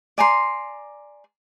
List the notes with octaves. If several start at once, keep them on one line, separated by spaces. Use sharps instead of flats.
D5 G#5 A#5 C6